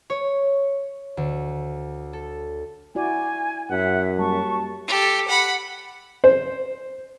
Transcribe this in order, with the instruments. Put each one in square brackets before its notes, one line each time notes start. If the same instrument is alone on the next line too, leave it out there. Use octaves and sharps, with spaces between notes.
[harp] C#5
D2
A4
[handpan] E4 F#4 D5 [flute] G#5
[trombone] F#2 [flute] E5 [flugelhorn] F#5
[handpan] G3 A#3 [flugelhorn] A5 [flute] C#6
[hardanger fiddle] G4 A4
F#5 B5
[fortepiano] C5